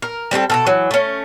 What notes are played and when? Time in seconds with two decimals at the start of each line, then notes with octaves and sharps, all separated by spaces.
0.02 A#4
0.31 G3 C4 D4 A4
0.50 B2 E3 A4
0.66 E3 F#3
0.91 A3 C#4